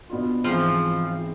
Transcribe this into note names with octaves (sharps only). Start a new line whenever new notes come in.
B2 B3 D4 F4
G#2 E3 F3 G#3 C4